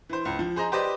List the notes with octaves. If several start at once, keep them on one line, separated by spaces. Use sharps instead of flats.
E3 C5
C#2
F3
G#4 C5 D#5 A#5
G4 B4 C5 D5 D#5